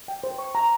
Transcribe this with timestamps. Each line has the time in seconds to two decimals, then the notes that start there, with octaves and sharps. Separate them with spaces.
0.08 G5
0.24 C5
0.39 C#6
0.55 A#5